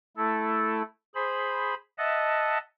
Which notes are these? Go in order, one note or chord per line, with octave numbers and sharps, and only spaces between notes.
A3 E4 A4
G#4 C5 B5
D#5 E5 F#5 A5